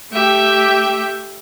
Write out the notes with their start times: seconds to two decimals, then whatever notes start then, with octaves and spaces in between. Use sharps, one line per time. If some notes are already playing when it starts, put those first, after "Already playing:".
0.11 A3 G4 E5 G5